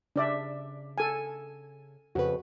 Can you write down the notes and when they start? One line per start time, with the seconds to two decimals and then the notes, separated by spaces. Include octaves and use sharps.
0.16 C#3 D4 D5 E5
0.98 A4 G#5
2.15 F2 C#3 F#4 B4